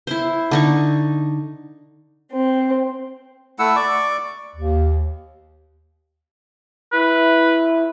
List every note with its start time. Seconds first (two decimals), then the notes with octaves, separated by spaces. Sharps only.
0.07 E4 C5
0.51 D3 D#4 C#6
2.32 C4
3.59 A3 E4 F#5 E6
3.76 D5 C#6 D6
4.55 D#2
6.93 E4 B4